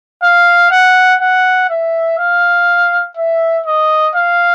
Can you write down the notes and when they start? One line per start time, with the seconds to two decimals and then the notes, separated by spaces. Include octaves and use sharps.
0.23 F5
0.72 F#5
1.21 F#5
1.70 E5
2.19 F5
3.17 E5
3.66 D#5
4.15 F5